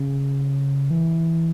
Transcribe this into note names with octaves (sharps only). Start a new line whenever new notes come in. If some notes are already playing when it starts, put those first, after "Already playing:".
Already playing: C#3
E3